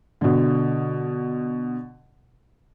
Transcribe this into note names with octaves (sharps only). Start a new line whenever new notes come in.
B2 D3